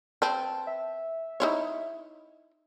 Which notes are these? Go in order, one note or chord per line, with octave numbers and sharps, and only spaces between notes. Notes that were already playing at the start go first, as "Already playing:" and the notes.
C4 B4 A5
E5
D#4 E4 C#5